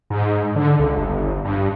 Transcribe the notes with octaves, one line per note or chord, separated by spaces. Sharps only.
G#2
D3
C#2
G1
G2